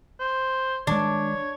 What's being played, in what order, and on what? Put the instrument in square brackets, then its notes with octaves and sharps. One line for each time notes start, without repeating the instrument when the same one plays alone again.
[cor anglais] C5
[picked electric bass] D#3 G#3 [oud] D4 [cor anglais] C#5